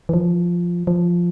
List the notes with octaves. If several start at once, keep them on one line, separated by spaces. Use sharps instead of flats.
E3
F3
F3